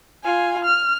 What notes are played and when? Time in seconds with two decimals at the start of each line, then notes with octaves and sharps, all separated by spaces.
0.23 F4 G#5
0.65 F6